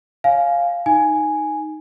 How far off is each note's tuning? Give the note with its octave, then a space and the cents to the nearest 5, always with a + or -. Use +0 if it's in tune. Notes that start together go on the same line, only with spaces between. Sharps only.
C#5 +10 F5 +0 G#5 +15
D#4 +0 G#5 +0